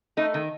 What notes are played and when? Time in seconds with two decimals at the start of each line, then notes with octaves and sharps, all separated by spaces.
0.17 A3 D#4
0.34 D#3